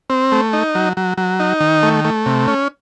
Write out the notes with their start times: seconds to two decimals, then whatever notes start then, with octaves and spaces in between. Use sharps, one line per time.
0.10 C4
0.32 A3
0.53 D#4
0.75 F#3
0.97 F#3
1.18 F#3
1.40 D#4
1.60 D#3
1.83 A3
2.05 A3
2.26 C3
2.47 C#4